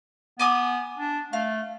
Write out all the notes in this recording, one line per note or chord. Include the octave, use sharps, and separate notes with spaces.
B3 G#5 D6 D#6
D4
A3 F5